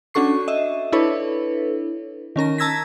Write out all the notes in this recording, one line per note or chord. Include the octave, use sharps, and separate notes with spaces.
C#4 D4 F#4 A4 C#6 C7
D#5 E5
D4 E4 A4 B4 C#5
D#3 C#4 A#4 A#6
A5 A#5 E6 G#6 A#6 B6